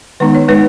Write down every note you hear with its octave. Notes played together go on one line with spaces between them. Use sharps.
D#3 G#3 B3 D#4 B4
C#5
G#3 D#4 B4